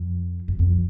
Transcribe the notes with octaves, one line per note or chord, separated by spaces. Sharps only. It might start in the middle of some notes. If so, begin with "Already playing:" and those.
Already playing: F2
F#2
F2